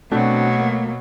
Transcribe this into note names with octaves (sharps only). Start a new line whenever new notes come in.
B2 F#3 A3 C4 D4 F#4
A#3